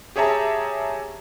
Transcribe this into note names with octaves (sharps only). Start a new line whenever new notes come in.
G4 G#4 C#5 E5 A5 A#5